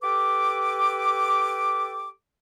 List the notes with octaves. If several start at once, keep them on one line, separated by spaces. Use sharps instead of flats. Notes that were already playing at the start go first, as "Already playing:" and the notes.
G4 A4 B4 D6